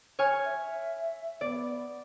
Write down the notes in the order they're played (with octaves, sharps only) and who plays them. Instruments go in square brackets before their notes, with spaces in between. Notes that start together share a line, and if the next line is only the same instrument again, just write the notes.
[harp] C#5 G#5 F6
[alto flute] E5
[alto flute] B3 [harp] D5